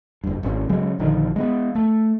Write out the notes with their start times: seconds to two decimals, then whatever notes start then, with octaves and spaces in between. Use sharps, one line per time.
0.24 F#1 G2
0.43 G#1 C#4
0.69 C#3 F#3 G#3 C#4
0.99 A#1 D3 D#3 F3
1.36 G#3 A#3 B3
1.75 A3